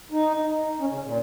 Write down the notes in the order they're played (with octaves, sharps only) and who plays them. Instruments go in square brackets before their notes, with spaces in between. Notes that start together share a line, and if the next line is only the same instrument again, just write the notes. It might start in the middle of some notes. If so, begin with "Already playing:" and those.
[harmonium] D#4
C#4
C#3
A#2